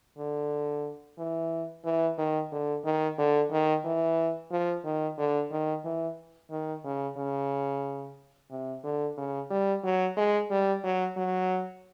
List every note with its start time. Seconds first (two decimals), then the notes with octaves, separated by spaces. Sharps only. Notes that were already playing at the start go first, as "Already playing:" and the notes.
0.18 D3
1.18 E3
1.85 E3
2.18 D#3
2.52 D3
2.85 D#3
3.18 D3
3.51 D#3
3.85 E3
4.51 F3
4.85 D#3
5.18 D3
5.51 D#3
5.85 E3
6.51 D#3
6.84 C#3
7.17 C#3
8.51 C3
8.84 D3
9.17 C#3
9.51 G3
9.84 F#3
10.17 G#3
10.51 G3
10.84 F#3
11.17 F#3